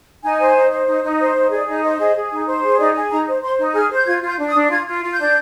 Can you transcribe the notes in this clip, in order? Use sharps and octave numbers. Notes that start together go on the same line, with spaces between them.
D#4 G#5
C5
D#4
C5
D#4
D#4
C5
D#4
G#4 D5
D#4
C5 D#5
G#4
G#4
D#4
C5
G#4
D#4 D5
G#4
D#4 A#5
C5
C5 C6
D#4
G#4 F6
C5 G6
F4 G#6
F4
G6
D4
D#6
D4
F4 G#6
F4
F4
G6
D4